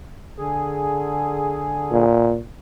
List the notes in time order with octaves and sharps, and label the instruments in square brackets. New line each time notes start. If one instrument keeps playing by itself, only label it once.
[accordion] D3 G#4
[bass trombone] A#2